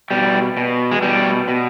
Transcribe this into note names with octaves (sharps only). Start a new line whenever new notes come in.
B2 G3
B2
G#3
B2 G3
B2